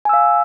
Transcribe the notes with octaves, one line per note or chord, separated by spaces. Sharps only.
F5 G#5 E6